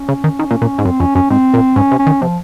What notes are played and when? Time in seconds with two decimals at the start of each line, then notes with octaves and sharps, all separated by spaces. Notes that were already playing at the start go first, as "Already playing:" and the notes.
Already playing: C#4
0.09 C#3
0.24 D#3
0.39 D#3
0.51 A#2
0.62 A#2
0.78 G#2
0.84 F#2 C4
1.00 F2 C#4
1.15 F#2 C#4
1.30 G#2 C4
1.54 A#2
1.76 G#2 C#4
1.91 C3
1.99 C#4
2.07 D#3
2.22 C3 F3